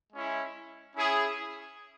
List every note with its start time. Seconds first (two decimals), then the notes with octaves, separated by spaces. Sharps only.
0.12 G#3 C#4 E4
0.96 C#4 E4 G#4